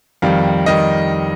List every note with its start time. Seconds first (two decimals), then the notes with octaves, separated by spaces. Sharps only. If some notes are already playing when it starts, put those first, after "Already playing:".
0.22 F2 D#3 G3 F5
0.66 F2 D#3 G3 D#5